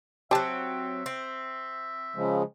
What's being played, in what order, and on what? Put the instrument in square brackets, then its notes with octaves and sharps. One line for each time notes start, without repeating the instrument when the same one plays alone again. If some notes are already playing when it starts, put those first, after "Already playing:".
[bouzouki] F#3 C4 [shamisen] G4 A5 [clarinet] E5
[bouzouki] C4
[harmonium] C#3 F3 G#3